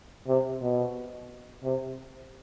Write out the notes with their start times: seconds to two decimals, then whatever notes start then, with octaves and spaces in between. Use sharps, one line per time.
0.27 C3
0.61 B2
1.63 C3